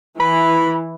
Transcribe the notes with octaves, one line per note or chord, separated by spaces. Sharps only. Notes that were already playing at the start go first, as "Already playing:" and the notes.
E3 B5